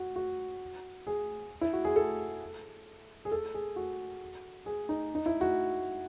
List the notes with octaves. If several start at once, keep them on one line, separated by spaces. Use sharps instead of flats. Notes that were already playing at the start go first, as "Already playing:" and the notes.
Already playing: F#4
F#4
G#4
E4
F#4
G#4
A4
G#4
A4
G#4
F#4
G#4
D#4
D#4
E4
F#4